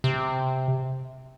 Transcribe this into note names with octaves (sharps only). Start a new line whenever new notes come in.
C3